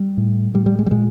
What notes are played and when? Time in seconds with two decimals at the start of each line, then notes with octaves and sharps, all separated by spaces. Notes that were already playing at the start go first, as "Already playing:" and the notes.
Already playing: G3
0.17 A2
0.54 A2 G3
0.66 G3
0.79 G#3
0.86 G3
0.91 A#2 G#3